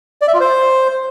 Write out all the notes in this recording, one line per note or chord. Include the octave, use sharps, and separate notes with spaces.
D5
E5
F4
C5